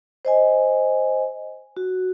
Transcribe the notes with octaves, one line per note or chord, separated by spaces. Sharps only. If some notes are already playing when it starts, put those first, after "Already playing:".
C5 D#5 G#5
F#4